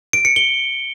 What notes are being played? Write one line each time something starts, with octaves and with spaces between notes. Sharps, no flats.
D7
C#7
G7